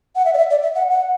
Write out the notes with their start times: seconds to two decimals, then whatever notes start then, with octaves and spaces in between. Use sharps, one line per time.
0.16 F#5
0.25 E5
0.34 D5
0.38 E5
0.51 D5
0.63 E5
0.75 F#5
0.90 F#5